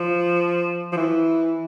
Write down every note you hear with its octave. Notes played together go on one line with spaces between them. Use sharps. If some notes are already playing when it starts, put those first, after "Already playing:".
Already playing: F3
F3
E3